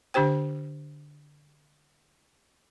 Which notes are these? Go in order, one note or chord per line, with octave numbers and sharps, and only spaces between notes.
D3 D4 G4 C5 G5